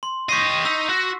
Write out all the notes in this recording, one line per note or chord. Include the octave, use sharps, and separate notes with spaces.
C6
G4 D#5 C#6 A#6 C7
D#4 E6 B6
F#4